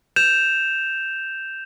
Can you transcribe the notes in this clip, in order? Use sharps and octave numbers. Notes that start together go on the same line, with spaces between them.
G6 E7 F7